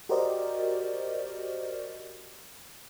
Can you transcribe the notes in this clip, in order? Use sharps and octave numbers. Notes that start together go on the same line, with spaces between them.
F#4 G4 A#4 C5 D5 D#5